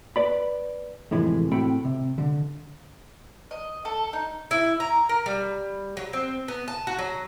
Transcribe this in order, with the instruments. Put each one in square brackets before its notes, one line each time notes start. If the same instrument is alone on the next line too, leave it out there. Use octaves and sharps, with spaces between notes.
[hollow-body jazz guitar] B4 D5 B5
F2 A2 C3 E3 G#3
A2 C4 F#4 G5 B5
C3
D3
[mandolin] D#5
A4
D#4
[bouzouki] E4
A#5
A#4
G3
F#3
C4
B3
A5
F#4
F#3